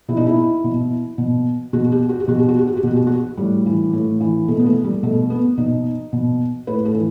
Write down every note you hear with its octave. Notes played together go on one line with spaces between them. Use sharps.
B2 E4
D#4
E4
B2
B2
B2 F#4
G4
F#4
G4
B2 F#4
G4
F#4
G4
F#4
G4
B2 F#4
G4
F#4
A2 G3
E3
A2
E3
B2 A3
B3
A3
G3
B2 A3
B3
B2 D#4
B2
A2 B4
A4
E3